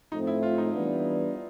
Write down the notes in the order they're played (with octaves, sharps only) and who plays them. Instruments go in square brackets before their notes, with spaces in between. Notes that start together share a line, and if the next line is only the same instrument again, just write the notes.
[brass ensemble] A2 F3 A3 C4 [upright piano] D#4
[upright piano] E4
F4
D#4
[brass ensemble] E3 G3 B3 D4